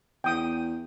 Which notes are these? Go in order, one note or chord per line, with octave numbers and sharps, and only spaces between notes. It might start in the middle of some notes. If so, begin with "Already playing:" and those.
E2 G5 D#6